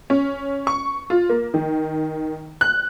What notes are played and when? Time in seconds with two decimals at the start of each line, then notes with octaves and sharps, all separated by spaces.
0.10 C#4
0.67 C#6
1.10 F4
1.29 A#3
1.54 D#3
2.61 F#6